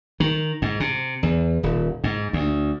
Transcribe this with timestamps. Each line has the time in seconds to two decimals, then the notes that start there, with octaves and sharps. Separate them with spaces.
0.20 D#3
0.62 G#2
0.80 C3
1.23 E2
1.63 D#1
2.04 G#2
2.33 D2